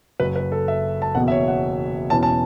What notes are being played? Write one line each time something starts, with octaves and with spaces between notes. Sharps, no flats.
F#1 F#2 F#3 B4
B4
A4
E5
A5
F#1 E2 B2 B3 F#5
E5
C#5
F#5
E1 E2 E3 C#4 A5
A5